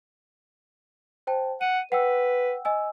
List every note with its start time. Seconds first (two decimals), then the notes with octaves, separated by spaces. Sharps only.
1.27 C5 G5 A5
1.61 F#5 D#7
1.92 B4 F#5 G5 E6
2.65 D#5 G#5 E6